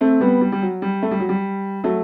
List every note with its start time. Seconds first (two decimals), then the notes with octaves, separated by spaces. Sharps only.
0.01 A3 C4
0.21 G3 B3
0.41 G3
0.52 G3
0.62 F#3
0.82 G3
1.02 A3
1.11 G3
1.20 F#3
1.29 G3
1.84 F#3 A3